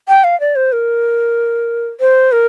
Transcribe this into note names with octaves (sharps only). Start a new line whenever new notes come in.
G5
F5
D5
C5
A#4
C5
A#4